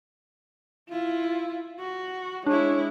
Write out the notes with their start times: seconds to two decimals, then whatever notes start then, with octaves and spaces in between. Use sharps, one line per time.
0.90 E4 F4
1.80 F#4
2.46 G#3 D4 E4 C#5